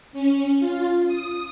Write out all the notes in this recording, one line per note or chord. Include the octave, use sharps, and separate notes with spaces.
C#4
F4
D#6